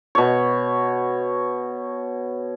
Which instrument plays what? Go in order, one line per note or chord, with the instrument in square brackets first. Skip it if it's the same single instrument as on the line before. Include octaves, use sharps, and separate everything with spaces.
[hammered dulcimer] B2 C#5